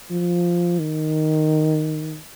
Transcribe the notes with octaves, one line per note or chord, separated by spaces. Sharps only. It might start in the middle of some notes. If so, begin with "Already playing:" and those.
F3
D#3